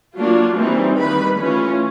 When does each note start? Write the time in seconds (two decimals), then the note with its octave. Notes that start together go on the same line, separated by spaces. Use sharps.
0.18 F#3 A#3 D4 F4
0.58 E3 G3 C4 D#4
0.98 D#3 G3 A#3 B4 B5
1.38 E3 A3 C#4 F4